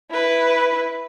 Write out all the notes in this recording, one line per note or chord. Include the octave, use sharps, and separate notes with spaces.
E4 B4